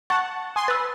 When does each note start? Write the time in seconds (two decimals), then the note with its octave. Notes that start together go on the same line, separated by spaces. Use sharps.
0.10 F#5 A5 C#6 A6
0.56 G#5 C6 D#6
0.68 B4 E6 A6